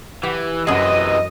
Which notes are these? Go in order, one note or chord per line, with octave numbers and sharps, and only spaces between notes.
E3 G4
F#2 C3 E3 G#4 D#5